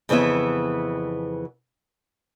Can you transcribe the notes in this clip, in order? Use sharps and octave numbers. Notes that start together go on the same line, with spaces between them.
F2 C#3 E3 B3 E5